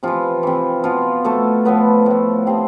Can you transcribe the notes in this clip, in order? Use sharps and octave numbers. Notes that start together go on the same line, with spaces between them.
C3 E3 F3 F4
C3 E3
B2 F3 F4
B2 A3 A4
A2 F3 B3 B4
A2 F3
C3 F3 C4 C5